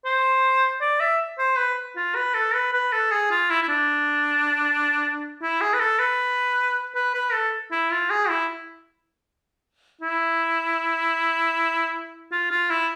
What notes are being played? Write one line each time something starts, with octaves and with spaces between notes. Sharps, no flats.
C5
D5
E5
C5
B4
F4
B4
A4
B4
B4
A4
G#4
F4
E4
E4
D4
E4
G#4
B4
A4
B4
B4
B4
A4
E4
F4
G#4
E4
E4
F4
F4
E4